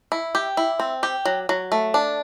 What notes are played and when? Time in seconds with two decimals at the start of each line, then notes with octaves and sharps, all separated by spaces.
0.12 E4
0.35 G4
0.57 E4
0.79 C4
1.03 G4
1.25 F#3
1.49 F#3
1.72 A3
1.94 D4